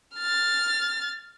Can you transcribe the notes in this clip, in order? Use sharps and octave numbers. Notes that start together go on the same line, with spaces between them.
F6 A6